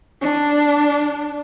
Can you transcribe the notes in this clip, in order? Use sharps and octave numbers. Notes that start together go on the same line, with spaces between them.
D4